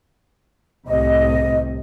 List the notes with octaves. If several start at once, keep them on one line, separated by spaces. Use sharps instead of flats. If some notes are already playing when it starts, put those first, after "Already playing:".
C2 A2 C3 D#5